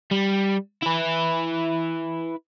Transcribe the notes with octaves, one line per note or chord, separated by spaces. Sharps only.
G3
E4 B4